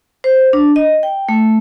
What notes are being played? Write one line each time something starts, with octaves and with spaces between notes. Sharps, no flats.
C5
D4
D#5
G5
A3